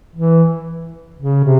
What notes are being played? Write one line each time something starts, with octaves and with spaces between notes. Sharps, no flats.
E3
C#3
C3